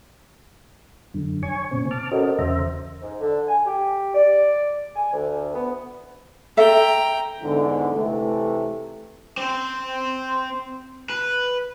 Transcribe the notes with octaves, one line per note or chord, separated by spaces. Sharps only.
F#2 D3
C#5 G#5 C#6
A#2 C#3 C4
A5 D6 F6
C#4 F#4 A4 A#4 C5 D#5
E2 C#3 C5 E5 A#5
G#2
D3
G#5
G4
D5
G#5
D2
B3
A4 E5 G5 A#5
E2 G#2 D3
C3 E3 A3
C4 C5
B4